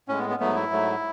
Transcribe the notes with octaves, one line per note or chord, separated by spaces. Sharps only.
A2 G#3 C#4
B3
B3
G#2 F#3 A3 B3
E4
G#2 F#3 A3